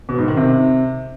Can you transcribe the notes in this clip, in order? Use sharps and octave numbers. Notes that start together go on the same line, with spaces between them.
B2
G#2
D#3
C3